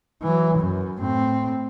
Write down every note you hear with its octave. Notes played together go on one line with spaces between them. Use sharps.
E3 F#3
F#2
A2 C4